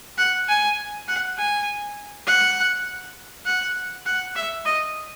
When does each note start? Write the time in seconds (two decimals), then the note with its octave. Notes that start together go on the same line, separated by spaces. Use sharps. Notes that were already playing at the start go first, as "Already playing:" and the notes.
0.18 F#5
0.48 G#5
1.08 F#5
1.38 G#5
2.27 F#5
3.46 F#5
4.06 F#5
4.36 E5
4.66 D#5